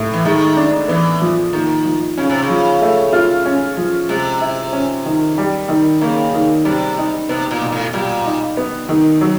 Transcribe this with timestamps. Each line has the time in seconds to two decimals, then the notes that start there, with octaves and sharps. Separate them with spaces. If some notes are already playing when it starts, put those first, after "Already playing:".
Already playing: A2
0.14 E3
0.25 D#3 G#3
0.57 D4
0.88 E3 B3
1.21 F3
1.53 D#3 A#3
1.85 F3
2.17 C#3 C#4
2.29 C3
2.42 C#3
2.49 F3
2.82 A3
3.13 F4
3.45 C#4
3.77 F3
4.09 C3 G#3
4.41 E4
4.73 C#4
5.06 D#3
5.38 G3
5.69 D#3
6.01 C#3 A#3
6.33 D#3
6.65 C3 G3
6.98 D#4
7.29 C3 B3
7.51 A#2
7.61 B2
7.72 A2
7.93 A#2 G3
8.26 D#4
8.57 B3
8.89 D#3
9.21 F#3